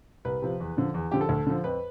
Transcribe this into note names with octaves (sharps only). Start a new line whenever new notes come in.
C2 B4
C3 F3
E2
D3 F3
E2
D3 F3 G4
A4
D2
D3 F3
F2 B4